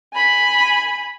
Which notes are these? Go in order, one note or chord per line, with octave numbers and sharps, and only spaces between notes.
G#5 B5